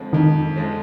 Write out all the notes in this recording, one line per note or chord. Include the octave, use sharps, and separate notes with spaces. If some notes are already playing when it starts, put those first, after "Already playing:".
Already playing: F2 D3 F3 G#3 C4
F2 D#3
D3 F3 G#3 C4